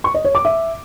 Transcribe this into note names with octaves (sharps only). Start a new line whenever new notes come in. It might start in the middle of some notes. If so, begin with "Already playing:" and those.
C#6
D#5
C#5
D6
E5